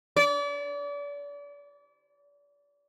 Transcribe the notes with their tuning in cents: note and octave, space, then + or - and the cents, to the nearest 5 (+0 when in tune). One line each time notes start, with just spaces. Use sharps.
D5 -35